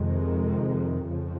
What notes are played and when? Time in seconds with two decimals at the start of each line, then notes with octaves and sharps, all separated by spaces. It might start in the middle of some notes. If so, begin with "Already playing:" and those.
Already playing: F2 C3 D#3 G#3
1.07 F2 C#3 F3